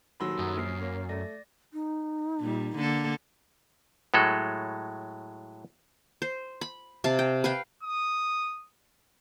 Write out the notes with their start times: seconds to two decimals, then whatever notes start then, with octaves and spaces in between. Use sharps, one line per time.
0.20 D#1 D#3 F#3 B5 C6 E6
0.39 F#2 D#6
0.57 A#1 F6 C7
0.79 A#3 C#5
1.09 A3 D5 A#6
1.73 D#4
2.40 A#2 G3
2.76 D3 A#3 A4
4.14 A2 F#3 G#3 A4
6.22 C5
6.61 B5
7.04 C3 F5 A5
7.19 G5
7.44 B4 F5 G5
7.83 D#6